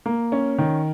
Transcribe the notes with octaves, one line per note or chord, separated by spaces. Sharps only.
A#3
C#4
D#3